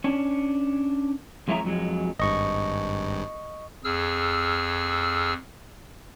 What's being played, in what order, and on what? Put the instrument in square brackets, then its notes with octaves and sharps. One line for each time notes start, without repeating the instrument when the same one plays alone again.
[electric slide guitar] C#4 D4 C#5
F2 G#3 E4 C#5 E5 A#5
F2 F#3 G#3
[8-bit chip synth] G#1 G2 [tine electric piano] D#5 C#6
[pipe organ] F2 G#4 E6 F6